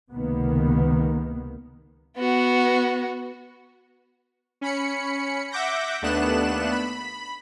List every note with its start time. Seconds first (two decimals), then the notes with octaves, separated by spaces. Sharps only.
0.12 C#2 C3 D#3 A#3 B3
2.17 B3 F#4
4.61 C#4 B5 C#7
5.52 E5 F#5 D6 G6 A#6
6.02 D#2 A3 B3 D4 F#6 E7
6.72 B5